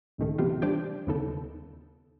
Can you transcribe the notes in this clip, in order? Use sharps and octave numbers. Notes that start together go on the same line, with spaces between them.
C#2 A2 D#3 A3
C3 E3 F3 B3 F4 G4
G3 D4 G4 C5 D5 G5
D#2 C#3 B3 D#4 A4